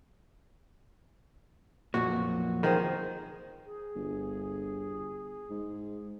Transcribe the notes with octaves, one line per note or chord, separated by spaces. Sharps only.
B1 F2 A#2 F#4
D#3 F3 G#4 C5
G#4
G1
G#2